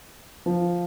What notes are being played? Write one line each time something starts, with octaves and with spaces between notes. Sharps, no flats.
F3